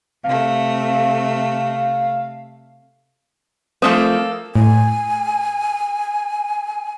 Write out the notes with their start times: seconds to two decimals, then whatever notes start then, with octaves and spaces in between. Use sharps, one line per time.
0.24 C3 A3 F5
3.82 F3 A3 A#3 C4 A4 D#6
4.55 A2 G#5